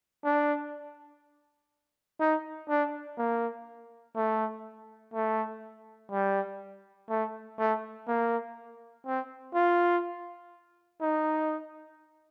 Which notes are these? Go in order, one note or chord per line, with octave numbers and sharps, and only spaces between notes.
D4
D#4
D4
A#3
A3
A3
G3
A3
A3
A#3
C4
F4
D#4